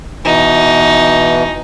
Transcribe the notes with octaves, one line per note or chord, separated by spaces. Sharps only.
B2 E3 D#4